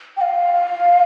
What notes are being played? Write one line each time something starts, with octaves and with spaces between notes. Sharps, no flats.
G5
F5